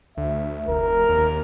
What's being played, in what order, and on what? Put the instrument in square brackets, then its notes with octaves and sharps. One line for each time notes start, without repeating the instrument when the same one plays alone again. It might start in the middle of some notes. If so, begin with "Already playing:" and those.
[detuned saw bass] D2 [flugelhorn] E5
[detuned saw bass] F1 [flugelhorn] A#4
[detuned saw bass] D#2